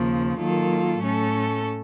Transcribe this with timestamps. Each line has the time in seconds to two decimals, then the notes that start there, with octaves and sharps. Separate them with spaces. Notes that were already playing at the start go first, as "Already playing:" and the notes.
Already playing: D#2 C#3 F3 A#3
0.38 D#3 F#3 A#3 F4 A4
1.01 A2 A3 C#4 A4